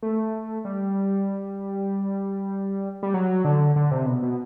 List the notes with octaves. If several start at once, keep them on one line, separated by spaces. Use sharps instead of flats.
A3
G3
G3
F#3
D3
D3
C3
B2
B2